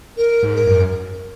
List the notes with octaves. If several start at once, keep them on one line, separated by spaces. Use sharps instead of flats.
A#4
G#2
A#4
F#2